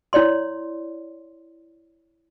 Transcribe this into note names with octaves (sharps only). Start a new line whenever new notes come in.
E4 C#5 D5 C6